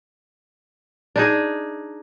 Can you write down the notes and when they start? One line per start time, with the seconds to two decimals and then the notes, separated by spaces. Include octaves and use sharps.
1.16 D4 D#4 G#4